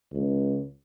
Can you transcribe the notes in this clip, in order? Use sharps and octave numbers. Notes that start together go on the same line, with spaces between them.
C#2